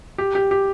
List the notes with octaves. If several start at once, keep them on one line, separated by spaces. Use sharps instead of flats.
G4
G4
G4